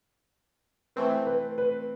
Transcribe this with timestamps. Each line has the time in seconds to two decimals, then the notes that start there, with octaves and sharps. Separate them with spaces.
0.96 E3 A3 C4 B4
1.27 B4
1.58 B4